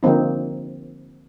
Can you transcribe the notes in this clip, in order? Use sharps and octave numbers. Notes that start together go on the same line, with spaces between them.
D3 F3 A#3 C4 D#4